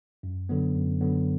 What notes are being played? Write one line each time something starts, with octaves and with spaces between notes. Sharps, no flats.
F#2
D3 F#3 B3
F#2
D3 F#3 B3